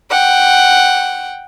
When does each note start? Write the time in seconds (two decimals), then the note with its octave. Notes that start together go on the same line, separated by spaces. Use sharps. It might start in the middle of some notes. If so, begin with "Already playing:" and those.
0.11 F#5 G5